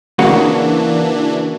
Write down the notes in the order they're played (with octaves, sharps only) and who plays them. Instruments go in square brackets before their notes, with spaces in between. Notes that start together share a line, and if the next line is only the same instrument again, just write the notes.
[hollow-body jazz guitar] C#3 A#3 F#4 [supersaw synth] E3 D4